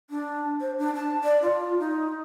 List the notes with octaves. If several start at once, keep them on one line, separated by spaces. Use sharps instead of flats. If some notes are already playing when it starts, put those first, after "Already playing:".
D4
C5
D4
A5
D5
F4
D#4